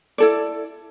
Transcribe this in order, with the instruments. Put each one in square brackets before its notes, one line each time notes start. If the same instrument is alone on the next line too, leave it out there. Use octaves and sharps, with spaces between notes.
[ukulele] E4 A4 D5